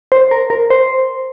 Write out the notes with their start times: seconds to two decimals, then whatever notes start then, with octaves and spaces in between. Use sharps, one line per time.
0.12 C5
0.31 A#4
0.50 A#4
0.70 C5